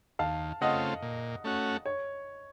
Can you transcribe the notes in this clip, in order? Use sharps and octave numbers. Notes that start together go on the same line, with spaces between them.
D#2 F5 A5
C#3 A3 C4 F4 D#5 F#5
A#2
A3 C#4 F#4
C#5